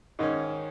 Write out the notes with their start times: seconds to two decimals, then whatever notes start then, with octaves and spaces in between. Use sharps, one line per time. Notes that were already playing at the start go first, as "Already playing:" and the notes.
0.19 G#2 D#3 C#4 D#4